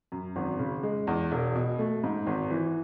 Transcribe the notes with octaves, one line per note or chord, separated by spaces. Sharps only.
F#2
G#1
C#3
G#3
E2
E1
B2
A3
G#2
G#1
E3